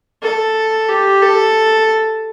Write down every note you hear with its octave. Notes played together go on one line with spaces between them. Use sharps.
A4
G4
A4